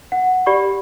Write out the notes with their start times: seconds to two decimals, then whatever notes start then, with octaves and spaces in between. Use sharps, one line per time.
0.12 F#5
0.46 G4 D5 B5 C#6